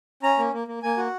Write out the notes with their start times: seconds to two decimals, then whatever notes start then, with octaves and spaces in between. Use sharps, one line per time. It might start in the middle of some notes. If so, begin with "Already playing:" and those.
0.23 C#4 A#5
0.38 A#3
0.53 A#3
0.68 A#3
0.83 A#3 G#5
0.98 F#4